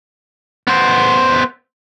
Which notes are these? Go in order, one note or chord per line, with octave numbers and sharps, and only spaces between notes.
B3 C5